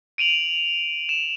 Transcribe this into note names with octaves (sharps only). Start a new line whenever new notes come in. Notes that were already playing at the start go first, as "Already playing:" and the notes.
D7 D#7 F7 F#7
E7